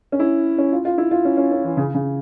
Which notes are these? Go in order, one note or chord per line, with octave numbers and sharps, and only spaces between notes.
C#4
E4
C#4
F4
F4
E4
F4
C#4
C#4
C#4
E3
C#3
C#3